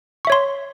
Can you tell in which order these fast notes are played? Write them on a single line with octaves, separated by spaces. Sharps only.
C#6 E5 C#5 C6